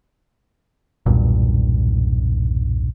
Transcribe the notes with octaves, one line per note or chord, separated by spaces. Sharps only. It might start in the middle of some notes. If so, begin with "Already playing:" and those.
B1 E2 G2 A#2